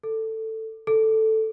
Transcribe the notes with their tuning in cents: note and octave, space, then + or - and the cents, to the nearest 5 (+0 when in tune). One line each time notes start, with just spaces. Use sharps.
A4 +10
A4 +0